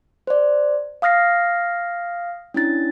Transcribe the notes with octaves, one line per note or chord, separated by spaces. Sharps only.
C5 D5
F5 D#6 F6 A#6 C7
C#4 D4 E4 A6